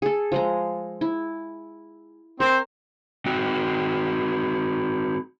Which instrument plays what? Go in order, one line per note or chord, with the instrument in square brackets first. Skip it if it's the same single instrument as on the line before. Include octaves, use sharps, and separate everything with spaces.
[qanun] G#4 A4
F3 G#3 A#5
E4
[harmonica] C4 C5 [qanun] A#4
[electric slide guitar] C4 D#4 F#4 G5